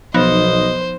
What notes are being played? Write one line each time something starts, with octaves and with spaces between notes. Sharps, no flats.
B1 F3 B3 D#4 C5 D#5